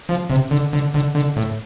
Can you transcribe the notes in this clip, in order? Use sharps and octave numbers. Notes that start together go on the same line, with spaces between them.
F3
C3
D3
D3
D3
D3
A2